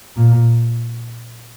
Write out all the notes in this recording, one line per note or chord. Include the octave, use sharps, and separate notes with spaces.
A#2